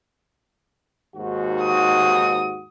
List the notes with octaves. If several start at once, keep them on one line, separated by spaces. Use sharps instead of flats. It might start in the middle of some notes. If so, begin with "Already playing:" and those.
D#2 G#2 F#4
D#6